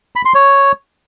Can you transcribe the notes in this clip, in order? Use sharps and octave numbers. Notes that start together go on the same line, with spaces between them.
B5
C6
C#5